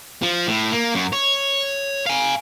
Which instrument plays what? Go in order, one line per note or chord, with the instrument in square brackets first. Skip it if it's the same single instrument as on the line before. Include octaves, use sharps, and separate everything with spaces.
[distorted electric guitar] F3
A2
A#3
F#2
C#5
F5 G#5